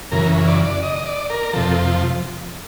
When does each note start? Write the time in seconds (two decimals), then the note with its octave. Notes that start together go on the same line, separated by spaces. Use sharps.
0.12 F#2 C#3 E3 A#4
0.47 D5
0.64 D5
0.83 D#5
1.06 D5
1.30 A#4
1.53 F2 C3 F3 A4